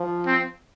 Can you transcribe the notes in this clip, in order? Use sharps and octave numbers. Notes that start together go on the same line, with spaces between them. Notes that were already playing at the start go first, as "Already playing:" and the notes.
Already playing: F3
C4